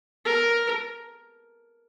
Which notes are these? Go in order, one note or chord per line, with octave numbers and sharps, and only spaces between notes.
A#4